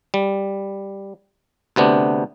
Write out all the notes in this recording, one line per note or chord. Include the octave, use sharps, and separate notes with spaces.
G3
D2 C3 B3 D4